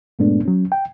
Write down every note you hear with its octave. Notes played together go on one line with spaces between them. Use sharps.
G2 A#2 G#3 A3 B3 D4
F#3 C#4
G5